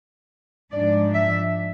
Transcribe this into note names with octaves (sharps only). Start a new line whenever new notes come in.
G#2 F3 G#3 D4 D5
E5